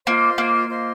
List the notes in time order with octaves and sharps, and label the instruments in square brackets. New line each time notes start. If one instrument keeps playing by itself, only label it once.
[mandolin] A#3 [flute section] F4 C5 D#5 C6
[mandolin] A#3
[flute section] F4 C5 D#5 C6